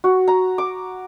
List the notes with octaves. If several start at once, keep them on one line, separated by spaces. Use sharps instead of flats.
F#4
A#5
D6